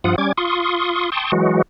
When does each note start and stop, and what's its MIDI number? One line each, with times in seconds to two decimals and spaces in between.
0.04 0.16 43
0.04 0.16 53
0.04 0.16 65
0.04 0.16 78
0.04 0.16 87
0.18 0.32 55
0.18 0.32 61
0.18 0.32 86
0.18 0.32 92
0.38 1.10 65
0.38 1.10 84
0.38 1.10 85
0.38 1.10 87
1.12 1.32 79
1.12 1.32 81
1.12 1.32 84
1.12 1.32 85
1.12 1.32 87
1.32 1.62 52
1.32 1.62 54
1.32 1.62 56
1.32 1.62 66